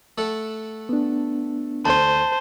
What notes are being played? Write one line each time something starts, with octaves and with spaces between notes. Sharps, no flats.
A3 A4 F#5
B3 D4
D2 C5 A5